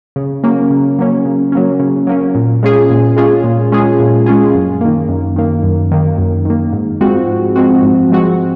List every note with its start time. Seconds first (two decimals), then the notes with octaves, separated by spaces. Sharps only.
0.16 C#3
0.43 F#3 A#3 C#4
0.70 C#3
0.99 F#3 A#3 C#4
1.25 C#3
1.52 F#3 A#3 C#4
1.80 C#3
2.07 F#3 A#3 C#4
2.35 A#2
2.63 G#3 C#4 F4 G#4
2.90 A#2
3.17 G#3 C#4 F4 G#4
3.44 A#2
3.72 G#3 C#4 F4 G#4
3.99 A#2
4.26 G#3 C#4 F4 G#4
4.55 F#2
4.81 D#3 A#3
5.08 F#2
5.36 D#3 A#3
5.63 F#2
5.91 D#3 A#3
6.18 F#2
6.45 D#3 A#3
6.72 G#2
7.01 F3 G#3 C4 F#4
7.27 G#2
7.56 F3 G#3 C4 F#4
7.82 G#2
8.10 F3 G#3 C4 F#4